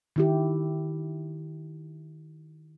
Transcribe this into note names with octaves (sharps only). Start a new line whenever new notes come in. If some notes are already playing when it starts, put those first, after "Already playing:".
D#3 E4 G4